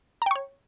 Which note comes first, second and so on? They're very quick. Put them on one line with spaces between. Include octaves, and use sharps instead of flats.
A#5 G5 C#6 C#5